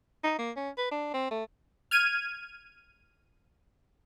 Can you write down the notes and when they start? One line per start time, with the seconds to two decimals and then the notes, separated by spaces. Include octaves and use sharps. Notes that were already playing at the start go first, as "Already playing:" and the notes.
0.24 D#4
0.39 A#3
0.57 C#4
0.78 B4
0.92 D4
1.14 C4
1.31 A3
1.91 F6 G#6 D#7